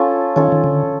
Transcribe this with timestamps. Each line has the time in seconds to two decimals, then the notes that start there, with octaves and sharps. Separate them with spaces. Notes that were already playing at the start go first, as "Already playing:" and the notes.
Already playing: C#4 F4 A4
0.36 D#3 C#4 F4 A4
0.52 D#3
0.64 D3